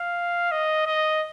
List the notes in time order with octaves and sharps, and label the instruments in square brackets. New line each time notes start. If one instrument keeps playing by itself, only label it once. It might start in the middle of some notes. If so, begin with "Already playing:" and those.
Already playing: [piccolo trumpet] F5
D#5
D#5